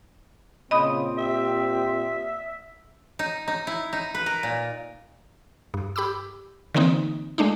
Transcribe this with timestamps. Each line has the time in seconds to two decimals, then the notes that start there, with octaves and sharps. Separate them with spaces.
0.71 A#2 C#3 C4 D#5 B5 D#6
1.18 G4 E5
3.19 D#4
3.48 D#4
3.67 E4
3.93 D#4
4.15 B4
4.26 A#4
4.43 A#2
5.74 G2
5.96 G4 B5 D6 E6
6.74 D3 E3 A#3 C4 D#4
7.38 G#3 A3 D4 D#4